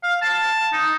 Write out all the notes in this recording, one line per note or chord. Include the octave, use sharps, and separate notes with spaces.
F5
A5
D#4